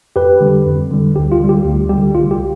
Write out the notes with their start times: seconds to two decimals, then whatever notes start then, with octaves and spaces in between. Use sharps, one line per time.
0.16 F2 G4 B4
0.41 D3 G3
0.66 F2
0.91 D3 G3
1.16 D2 G4
1.32 F4
1.40 D3 G3
1.49 G4
1.65 D2
1.89 D3 G3 G4
2.15 C2 F4
2.31 G4